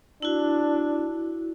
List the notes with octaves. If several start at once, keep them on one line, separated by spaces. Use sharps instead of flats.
D4 E4 F#4